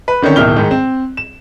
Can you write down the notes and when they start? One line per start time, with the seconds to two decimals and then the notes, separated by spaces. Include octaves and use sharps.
0.08 B4
0.22 D3 D#3 C4 C#4
0.36 D1 B2 D#3 E4 F6 G7
0.56 G#2 D#3
0.71 C4
1.17 E7